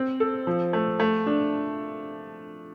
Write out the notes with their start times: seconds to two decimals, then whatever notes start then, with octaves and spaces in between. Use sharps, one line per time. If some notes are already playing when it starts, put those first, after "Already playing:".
Already playing: C4
0.20 A4
0.47 F3
0.73 A3
1.00 A3
1.27 D4